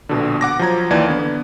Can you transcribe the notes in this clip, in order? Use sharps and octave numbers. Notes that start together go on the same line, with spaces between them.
A#1 B2 D3
F#5 D6 A#6
F3 F#3 A#5 G#6
D#2 E3 D5 G#6
D3 B3